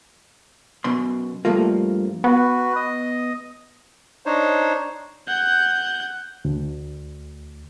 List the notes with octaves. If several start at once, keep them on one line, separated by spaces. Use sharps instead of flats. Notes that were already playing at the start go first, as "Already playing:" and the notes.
F#2 B2 C6
G2 F3 G3 A3 A#3 F4
B3 F#4 B4
D#5 D#6
D4 D#4 C5 C#5
F#5 G6
D2